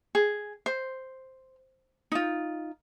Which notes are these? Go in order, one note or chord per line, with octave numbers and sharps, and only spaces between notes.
G#4
C5
D#4 F4